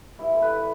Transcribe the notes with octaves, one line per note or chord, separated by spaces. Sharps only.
G2 E4
D3
B4